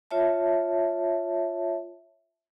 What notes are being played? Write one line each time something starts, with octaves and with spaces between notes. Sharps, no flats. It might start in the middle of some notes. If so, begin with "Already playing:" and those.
F4 C#5 E5 A5